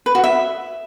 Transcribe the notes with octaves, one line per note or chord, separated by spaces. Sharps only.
B4
F#4
E5